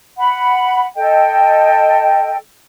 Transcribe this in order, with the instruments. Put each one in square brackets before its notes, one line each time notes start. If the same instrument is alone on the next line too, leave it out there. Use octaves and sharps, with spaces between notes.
[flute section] F#5 B5
A4 D#5 G5